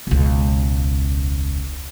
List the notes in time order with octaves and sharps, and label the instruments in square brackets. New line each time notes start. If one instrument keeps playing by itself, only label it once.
[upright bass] E1 C#2